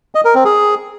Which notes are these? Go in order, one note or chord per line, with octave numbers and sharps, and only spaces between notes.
D#5
A#4
C4
G#4